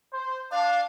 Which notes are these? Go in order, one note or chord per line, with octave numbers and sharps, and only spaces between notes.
C5
D4 F5